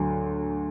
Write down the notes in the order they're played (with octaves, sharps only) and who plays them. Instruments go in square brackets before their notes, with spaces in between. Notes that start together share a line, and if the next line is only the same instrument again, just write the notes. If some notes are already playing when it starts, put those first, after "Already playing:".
Already playing: [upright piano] D2 D3 F#3